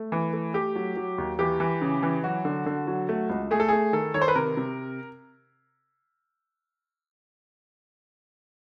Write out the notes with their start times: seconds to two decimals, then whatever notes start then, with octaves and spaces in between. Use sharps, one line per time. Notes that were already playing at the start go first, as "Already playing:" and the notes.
Already playing: A3
0.12 E3
0.33 A3
0.54 A3 G4
0.75 F#3
0.96 F#3
1.18 D#2
1.39 E3 G4
1.60 E3
1.81 C#3
2.03 E3
2.24 F#3 F#4
2.45 D3
2.66 D3
2.87 F#3
3.09 A3
3.30 C#2
3.51 A3 G#4
3.60 A4
3.69 A3 G#4
3.93 D#3 A4
4.14 D#3 C#5
4.22 C5
4.28 B4
4.35 C3 A#4
4.57 C3